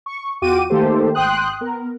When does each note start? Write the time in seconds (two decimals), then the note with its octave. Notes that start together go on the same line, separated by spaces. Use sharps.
0.06 C#6
0.42 E2 F4 F#4 G5 D6 D#7
0.70 D#3 A3 A#3 G4 A4 C5
1.15 G#1 G5 C6 D#6 F#6
1.61 B3 A#4